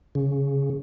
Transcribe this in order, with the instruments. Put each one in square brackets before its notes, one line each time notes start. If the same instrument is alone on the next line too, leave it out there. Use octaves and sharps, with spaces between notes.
[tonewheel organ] C#3